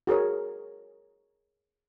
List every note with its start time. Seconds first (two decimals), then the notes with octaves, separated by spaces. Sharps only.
0.07 F#4 G#4 A#4 C#5